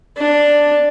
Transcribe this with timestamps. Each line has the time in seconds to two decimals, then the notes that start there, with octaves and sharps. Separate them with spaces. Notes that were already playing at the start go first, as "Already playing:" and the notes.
0.17 D4